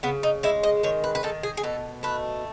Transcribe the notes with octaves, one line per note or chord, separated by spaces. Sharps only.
C#3 B3
D#4
G#3 E4
D#5
D#3 C#5
B4
B4
D#3 A4
G#4
G#4
B2 A4
A3 B4